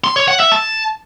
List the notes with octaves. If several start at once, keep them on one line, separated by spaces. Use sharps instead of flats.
C6
C#5
F#5
E5
A5